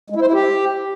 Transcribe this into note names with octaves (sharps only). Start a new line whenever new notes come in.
G#3
E4
C5
E4
G4